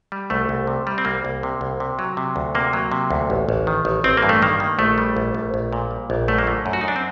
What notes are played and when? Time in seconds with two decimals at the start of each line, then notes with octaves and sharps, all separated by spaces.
0.12 G3
0.30 C2 A3
0.49 C2
0.67 C3
0.87 G3
0.98 C4
1.05 C2 A#3
1.25 C2
1.43 C3
1.61 C2
1.80 C3
1.99 F#3
2.17 C3
2.36 D2
2.55 C3 A#3
2.73 F#3
2.92 C3
3.11 D2
3.30 A1
3.49 A1
3.67 D#3
3.85 A1
4.04 A1 C4
4.17 A#3
4.23 G2
4.29 A3
4.42 D#3 A#3
4.60 D#3
4.78 A#1 A3
4.98 G3
5.16 A#1
5.35 A#1
5.54 A#1
5.73 A#2
5.91 G3
6.10 A#1
6.28 F#2 A3
6.38 A#3
6.47 D3 A3
6.66 F#2
6.73 F#4
6.81 D#4
6.84 F#2 D4
6.96 C4